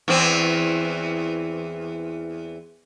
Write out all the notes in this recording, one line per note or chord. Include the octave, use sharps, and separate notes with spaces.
E2 E3 C4